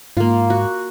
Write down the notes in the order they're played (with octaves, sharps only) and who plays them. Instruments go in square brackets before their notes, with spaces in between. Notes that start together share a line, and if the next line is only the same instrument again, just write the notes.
[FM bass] G#2 [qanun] A#3 F4
[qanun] F#4